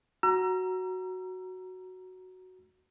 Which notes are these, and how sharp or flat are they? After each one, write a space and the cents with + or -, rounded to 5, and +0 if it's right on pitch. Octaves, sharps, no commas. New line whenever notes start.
F#4 +0 A#5 +10 E6 +40